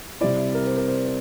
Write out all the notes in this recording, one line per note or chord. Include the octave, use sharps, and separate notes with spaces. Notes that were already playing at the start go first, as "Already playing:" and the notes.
C3 G3 C4 E4 D5
A#4
C5
A#4
C5
C5